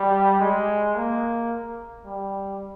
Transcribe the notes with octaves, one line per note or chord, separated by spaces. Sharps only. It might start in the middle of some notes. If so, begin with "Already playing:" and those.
Already playing: G3
G#3
A#3
G3